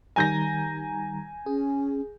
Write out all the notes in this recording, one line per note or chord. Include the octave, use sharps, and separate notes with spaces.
D#3 G3 G#5 A#5 G6 A#6
C#4 G#4